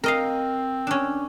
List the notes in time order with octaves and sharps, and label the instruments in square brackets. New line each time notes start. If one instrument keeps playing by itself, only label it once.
[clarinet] C4 [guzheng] A#4 D#5 F5
[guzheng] C#4 D4